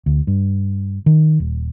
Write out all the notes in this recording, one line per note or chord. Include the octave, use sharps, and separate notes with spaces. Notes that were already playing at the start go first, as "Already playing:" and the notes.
D2
G2
D#3
D#1